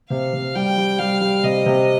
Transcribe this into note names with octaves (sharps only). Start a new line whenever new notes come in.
C3 F5
C3
G3 G5
G3
G3 F5
G3
C3 D#5
C3